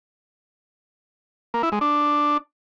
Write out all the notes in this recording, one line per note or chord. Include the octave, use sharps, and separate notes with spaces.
A#3
E4
G#3
D4